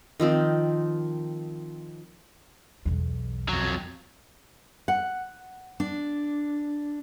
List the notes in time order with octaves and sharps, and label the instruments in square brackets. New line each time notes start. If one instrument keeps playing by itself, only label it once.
[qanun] D#3 F3 C4
[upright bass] B1 E2
[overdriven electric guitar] F2 F#3
[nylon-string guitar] F#5
D4